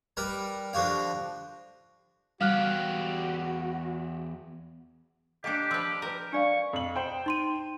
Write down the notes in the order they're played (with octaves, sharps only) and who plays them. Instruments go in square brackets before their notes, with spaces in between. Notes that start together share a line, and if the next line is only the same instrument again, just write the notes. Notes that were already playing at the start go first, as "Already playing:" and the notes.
[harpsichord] G3 A#4 B4
D3 F3 F#4 G4 F5
[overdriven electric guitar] E2 G4 [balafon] G3 [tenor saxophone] F#4 [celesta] F5 F6 F#6
[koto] A#3 D4 [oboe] G4 [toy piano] D#5 G5
[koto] F3 B4 [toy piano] C6 E6
[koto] A#4 [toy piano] B4 A#5
[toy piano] D4 D5 F5 [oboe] C#6
[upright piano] F2 F#7
C5 G5
[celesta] D#4 C6 D#7